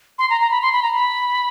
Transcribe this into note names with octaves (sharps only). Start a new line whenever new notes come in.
C6
A#5
A#5
B5
C6
B5
A#5
B5